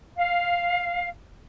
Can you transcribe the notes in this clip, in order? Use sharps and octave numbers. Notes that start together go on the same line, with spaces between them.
F5